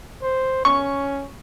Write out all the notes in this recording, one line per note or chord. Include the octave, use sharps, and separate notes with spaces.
C5
C#4 C#6